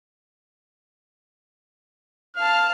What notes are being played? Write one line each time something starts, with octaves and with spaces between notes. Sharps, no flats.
F5 A5 F6